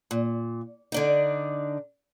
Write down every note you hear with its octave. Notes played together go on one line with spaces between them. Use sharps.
A#2
D3 D4 D#4